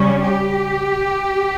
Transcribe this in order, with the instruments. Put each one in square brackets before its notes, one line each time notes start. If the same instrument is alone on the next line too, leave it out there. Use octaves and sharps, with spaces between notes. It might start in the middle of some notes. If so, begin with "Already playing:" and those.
Already playing: [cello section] C#3 G3 C#4
G4